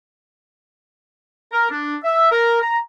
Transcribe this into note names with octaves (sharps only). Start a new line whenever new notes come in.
A#4
D4
E5
A#4
A#5